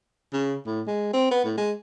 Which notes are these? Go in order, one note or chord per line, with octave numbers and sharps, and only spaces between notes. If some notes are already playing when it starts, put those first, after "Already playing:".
C#3
A2
G#3
C4
B3
A2
G#3